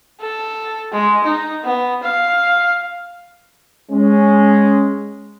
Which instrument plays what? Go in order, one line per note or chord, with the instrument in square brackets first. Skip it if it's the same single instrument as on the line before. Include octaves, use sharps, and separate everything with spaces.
[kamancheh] A4
G#3
D#4
B3
F5
[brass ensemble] G#3 C#4